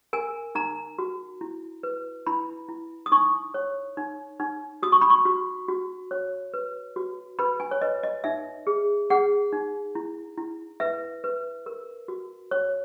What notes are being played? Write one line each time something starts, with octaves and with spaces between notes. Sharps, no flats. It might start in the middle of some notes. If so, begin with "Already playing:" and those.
A#4 G#5
D#4 A#5
F#4
E4
B4
E4 B5
E4
D#6
D#4 C#6
C#5
D#4
D#4
F#4 D#6
C#6
B5
C#6
F#4
F#4
C#5
B4
F#4
B4 B5
G#5
C#5
B4 D#5
D#5
D#4 E5
G#4
G#4 F#5
D#4
E4
E4
B4 E5
B4
A#4
F#4
C#5